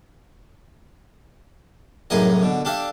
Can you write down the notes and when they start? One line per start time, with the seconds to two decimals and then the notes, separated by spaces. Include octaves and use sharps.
2.10 C2 F#2 A2 A#3 G#4 D#5
2.42 B2 D3
2.65 D4 G4 A4 E5 F5